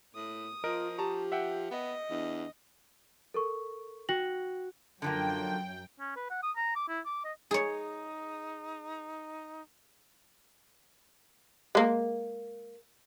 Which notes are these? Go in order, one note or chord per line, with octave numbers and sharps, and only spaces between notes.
A2 D#6
F3 F4 A#4 D#5 D7
G4 A5 A#5 C#6
E5 F#5 G5
B3 D#5
E2 D4
A4 A#4 C#6
F#4 G5 A#6 F#7
F#2 D3 F3 A#3 G5
C#4
B4
F#5
D#6
A#5
D6
E4
D6
D#5
D#4 G#4 C#5
G#3 A#3